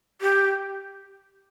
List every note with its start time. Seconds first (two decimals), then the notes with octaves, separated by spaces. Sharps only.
0.21 G4